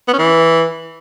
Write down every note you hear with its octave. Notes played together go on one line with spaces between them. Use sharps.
B3
C#4
E3